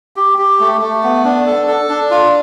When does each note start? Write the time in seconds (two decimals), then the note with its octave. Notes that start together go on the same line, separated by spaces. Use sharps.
0.16 G4
0.38 G4
0.60 A3
0.81 A3
1.03 B3
1.25 D4
1.46 A4
1.68 A4
1.89 D4
2.11 F4